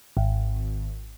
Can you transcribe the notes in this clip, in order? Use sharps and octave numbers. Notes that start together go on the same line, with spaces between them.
G#1